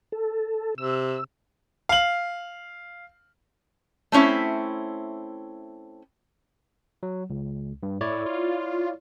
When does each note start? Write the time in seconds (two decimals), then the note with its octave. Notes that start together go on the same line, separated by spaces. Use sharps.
0.12 A4
0.78 C3 E6
1.89 F5 F#7
4.12 A3 C4 C#4 E4 E5
7.03 F#3
7.30 C#2
7.83 G2
8.01 A2 E4 C#5 D5
8.26 F4